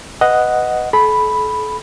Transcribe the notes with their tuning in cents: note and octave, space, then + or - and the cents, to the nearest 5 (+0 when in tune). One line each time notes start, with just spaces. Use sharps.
B4 +10 D#5 +0 F#5 +0
A4 -40 B5 +0